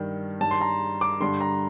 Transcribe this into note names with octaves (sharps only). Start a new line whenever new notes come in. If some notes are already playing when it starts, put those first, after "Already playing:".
Already playing: G2 D#3
G2 D#3 A5
C6
A#5
D6
G2 D3 C6
A#5